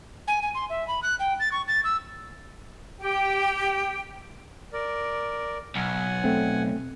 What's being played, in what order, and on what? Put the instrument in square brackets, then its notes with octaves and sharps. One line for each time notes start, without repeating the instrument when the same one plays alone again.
[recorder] G#5
G#5
C6
E5
B5
F#6
G5
A6
C#6
A6
E6
[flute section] G4 G5
[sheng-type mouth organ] A#4 D5
[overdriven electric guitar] B1 [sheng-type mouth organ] F#5 G#5
[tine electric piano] A3 C4